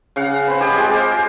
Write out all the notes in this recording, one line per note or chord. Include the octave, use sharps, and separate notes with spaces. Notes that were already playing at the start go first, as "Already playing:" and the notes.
C#3 F5 F#5
C4 B4
G4 G#4 D#5 G5
G#3 F4
C5
C6